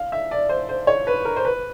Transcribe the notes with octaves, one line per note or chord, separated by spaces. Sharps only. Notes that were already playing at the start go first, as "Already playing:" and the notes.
Already playing: F5
E5
D5
C5
C5
C#5
B4
A#4
C5
B4